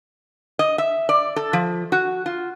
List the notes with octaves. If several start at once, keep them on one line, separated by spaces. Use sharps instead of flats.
D#5
E5
D5
A4
F3
F#4
F4